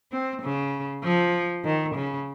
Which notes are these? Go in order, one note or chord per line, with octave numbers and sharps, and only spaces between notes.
C4
C#3
F3
D#3
C#3